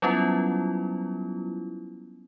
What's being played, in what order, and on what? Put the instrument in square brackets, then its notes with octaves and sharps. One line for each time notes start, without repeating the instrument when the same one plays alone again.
[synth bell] F#3 G3 B3 C#4 E4 F4